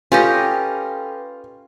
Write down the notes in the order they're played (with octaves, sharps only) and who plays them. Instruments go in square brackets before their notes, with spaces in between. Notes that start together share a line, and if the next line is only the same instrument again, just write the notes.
[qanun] C#4 G4 D#5 [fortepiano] F4 [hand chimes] A4 B4 G5